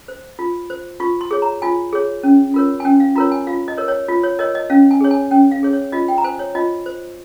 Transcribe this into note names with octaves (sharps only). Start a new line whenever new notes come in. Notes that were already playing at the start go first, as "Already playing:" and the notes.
C5
F4
C5
F4 C#6
C6
G#4 C#5
A#5
F4 G#5
G#4 C#5
C#4
F4 A#4 C#5
G#5
C#4 G5
F5
F4 A#4 C#5 A#5
G#5
F4 F5
D#5
A#4 C#5
C#5
F4
C#5
A#4 C#5 D#5
D#5
C#4 F5
G#5
G#4 C#5
G#5
C#4 G5
F5
G#4 C#5
C#5
F4 D#5
G5
A#5
C5 G#5
C#5
F4 D#5
C5